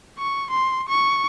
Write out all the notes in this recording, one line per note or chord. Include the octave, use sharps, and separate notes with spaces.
C#6
C6
C#6